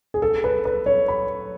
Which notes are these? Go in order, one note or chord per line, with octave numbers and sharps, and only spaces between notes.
G#4
A4
B4
B4
C#5
B5